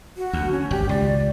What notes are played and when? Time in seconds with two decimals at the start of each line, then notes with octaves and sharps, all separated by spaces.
0.17 F#4
0.33 D2
0.52 C#4
0.71 G#1 G4
0.89 C#2 D5